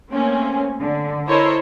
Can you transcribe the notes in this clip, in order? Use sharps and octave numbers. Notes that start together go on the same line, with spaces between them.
A3 A#3 C4 C#4
D3
E4 A4 A#4 C5 C#5 D#5